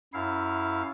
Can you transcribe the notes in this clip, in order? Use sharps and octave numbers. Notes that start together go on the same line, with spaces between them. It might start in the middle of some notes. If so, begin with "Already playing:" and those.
F#2 E4 F5